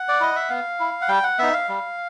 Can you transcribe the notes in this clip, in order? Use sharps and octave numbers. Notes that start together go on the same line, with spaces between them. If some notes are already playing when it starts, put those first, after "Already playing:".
Already playing: F#5
D5
E4 D#5
E5
B3 F5
E4
F#5
G3 G5
F#5
B3 D#4 E5
F5
G3